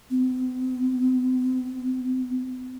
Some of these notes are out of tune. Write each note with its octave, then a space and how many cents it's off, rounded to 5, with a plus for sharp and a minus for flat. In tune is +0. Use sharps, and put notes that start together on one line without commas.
C4 -45